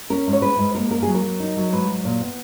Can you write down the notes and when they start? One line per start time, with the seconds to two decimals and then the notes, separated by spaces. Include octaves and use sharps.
0.10 C#4 A#4
0.27 G#2
0.33 C#5
0.42 G#2 B4
0.58 G#2
0.75 A#3 A#4
0.90 A#3 A#4
1.03 F#3 G#4
1.15 A#4
1.23 F#3
1.40 D#4
1.57 F#3
1.72 G#2 B4
1.88 F#3
2.05 A#2
2.21 B3